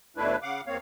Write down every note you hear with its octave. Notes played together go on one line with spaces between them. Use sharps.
D#2 B2 A3 D4 E4 B4
C#3 F5 F#5 D6
E2 A#3 C4 C#5 F5